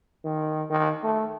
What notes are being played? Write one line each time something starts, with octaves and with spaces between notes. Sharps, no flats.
D#3
D#3
A3